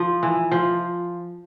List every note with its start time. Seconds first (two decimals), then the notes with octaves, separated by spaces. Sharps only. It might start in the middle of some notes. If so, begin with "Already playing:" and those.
Already playing: F3
0.23 E3
0.51 F3